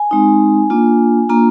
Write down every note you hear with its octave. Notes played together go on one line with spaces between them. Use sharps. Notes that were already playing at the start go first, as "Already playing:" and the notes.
Already playing: G#5
G#3 C4 D#4
A#3 D4 F4
A#3 D4 F4 A#5